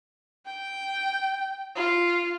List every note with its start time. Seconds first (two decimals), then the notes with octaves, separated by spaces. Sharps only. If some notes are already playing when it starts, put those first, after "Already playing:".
0.46 G5
1.75 F4